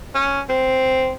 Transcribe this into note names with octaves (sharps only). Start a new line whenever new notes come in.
C#4
C4